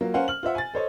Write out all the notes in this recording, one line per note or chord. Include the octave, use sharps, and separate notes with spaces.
F#3 A#3 F4
C#4 A#4 C5 F5 F#5 G#5
F6 F#7
F4 C5 E5 F#5
G#5 A6
A4 C5 C#5 D#5